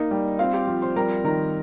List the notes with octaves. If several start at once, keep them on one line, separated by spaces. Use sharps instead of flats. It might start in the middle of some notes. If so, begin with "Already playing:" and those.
Already playing: A#3 D#4 D#5
G3
C4 F4 F5
G4 G5
F3
C5 C6
G3 A#4 A#5
D#3 A#4 A#5